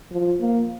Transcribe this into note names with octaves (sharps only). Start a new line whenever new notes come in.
F3
A#3